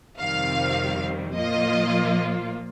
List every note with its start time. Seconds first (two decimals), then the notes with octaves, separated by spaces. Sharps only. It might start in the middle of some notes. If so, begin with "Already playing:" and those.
0.18 F2 C3 D#3 G3 C4 F5
1.36 A#2 F3 A#3 F4 D#5